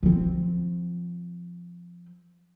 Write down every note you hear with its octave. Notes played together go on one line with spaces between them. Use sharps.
F3 C4